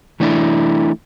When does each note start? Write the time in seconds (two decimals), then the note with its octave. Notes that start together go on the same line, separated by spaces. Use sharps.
0.20 E3 A3 D4 E4